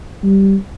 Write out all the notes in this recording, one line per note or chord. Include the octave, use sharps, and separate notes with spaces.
G3